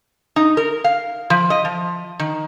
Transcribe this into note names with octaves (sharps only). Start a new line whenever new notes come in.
D#4
A#4
F5
F3
D#5
F3
D#3